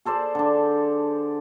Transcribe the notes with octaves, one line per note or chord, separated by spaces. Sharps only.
G#4 A4 C5 D5
D3 D4